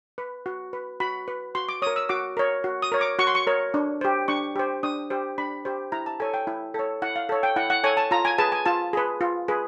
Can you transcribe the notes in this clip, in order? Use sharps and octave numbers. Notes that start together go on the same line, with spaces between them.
B4
F#4
B4
F#4 B5
B4
F#4 C6
D6
A#4 C#5 D#6
E6
F#4 D6
A#4 C#5
F#4
D#6
A#4 C#5
D6
F#4 C#6
C6
C#6
A#4 C#5
D4
G4 C5
D4 C#6
G4 C5
D4 D#6
G4 C5
D4 B5
G4 C5
E4 A#5
A5
A4 C#5 G#5
G5
E4
A4 C#5
E4 F#5
F5
A4 C#5
G5
E4 F#5
F#5
A4 C#5 G#5
A5
F4 A#5
G#5
G#4 B4 A5
G#5
F4 A5
G#4 B4
F4
G#4 B4